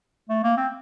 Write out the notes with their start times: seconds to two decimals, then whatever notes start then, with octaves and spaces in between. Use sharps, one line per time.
0.30 A3
0.43 A#3
0.57 C4